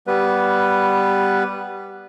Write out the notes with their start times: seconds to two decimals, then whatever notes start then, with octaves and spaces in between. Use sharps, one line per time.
0.07 G3 B3 B4